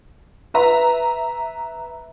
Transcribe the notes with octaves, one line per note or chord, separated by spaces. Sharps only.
B4 E5 A#5